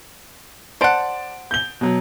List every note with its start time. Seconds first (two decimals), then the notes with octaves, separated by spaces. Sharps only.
0.81 C5 D5 F#5 A5 D7
1.51 G6 G7
1.81 B2 F#3